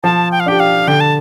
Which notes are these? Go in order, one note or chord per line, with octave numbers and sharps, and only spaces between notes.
F3 A5
G5
F5
D4 G4 G5
F5
D3 G5
A5